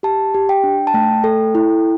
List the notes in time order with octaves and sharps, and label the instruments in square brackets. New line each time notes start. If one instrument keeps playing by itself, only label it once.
[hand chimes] G4 A5
G4
G5
D4
A5
A3 G5
A4
E4